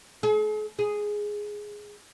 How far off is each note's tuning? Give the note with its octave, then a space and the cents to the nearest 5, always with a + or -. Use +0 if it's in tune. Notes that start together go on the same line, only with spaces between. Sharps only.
G#4 +45
G#4 +0